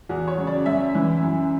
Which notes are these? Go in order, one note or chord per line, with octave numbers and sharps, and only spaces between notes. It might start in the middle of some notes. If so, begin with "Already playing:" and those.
E2 F#4
C#5
C#3 F#3
D5
F#2 E5
E3
F#2